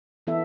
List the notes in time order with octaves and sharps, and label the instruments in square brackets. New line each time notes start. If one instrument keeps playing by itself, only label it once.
[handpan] E3 B3 E4 A4 E5